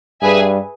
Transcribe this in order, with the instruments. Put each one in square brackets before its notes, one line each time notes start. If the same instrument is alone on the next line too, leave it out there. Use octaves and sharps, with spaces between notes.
[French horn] G2 [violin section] G#4 B4 E5 G#5